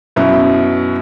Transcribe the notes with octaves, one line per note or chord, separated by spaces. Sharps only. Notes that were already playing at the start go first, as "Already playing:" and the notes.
F#2 B2 E4